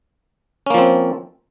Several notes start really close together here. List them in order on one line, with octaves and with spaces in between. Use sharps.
C#4 A#3 F3 C4